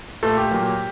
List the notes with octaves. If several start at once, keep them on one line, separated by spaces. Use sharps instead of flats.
A#2 A3 A4
G4
A#2 F#3 A#3